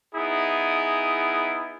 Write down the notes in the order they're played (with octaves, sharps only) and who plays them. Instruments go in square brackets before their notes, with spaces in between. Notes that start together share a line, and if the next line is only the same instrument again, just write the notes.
[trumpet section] B3 D#4 E4 G#4